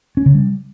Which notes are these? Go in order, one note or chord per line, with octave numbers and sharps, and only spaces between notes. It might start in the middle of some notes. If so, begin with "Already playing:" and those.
C#4
C#3
G3